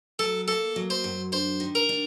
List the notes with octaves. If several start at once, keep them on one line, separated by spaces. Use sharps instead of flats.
F#3 A4
A#3 A4
F#3
C5
F#2
D4 C5
D#3
A#4
D4